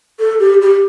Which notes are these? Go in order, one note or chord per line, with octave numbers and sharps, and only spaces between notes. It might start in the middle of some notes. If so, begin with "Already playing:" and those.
A4
G4
G4